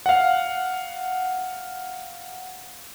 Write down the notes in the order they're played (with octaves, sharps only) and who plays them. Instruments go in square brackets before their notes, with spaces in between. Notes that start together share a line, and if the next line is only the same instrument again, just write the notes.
[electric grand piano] F5 F#5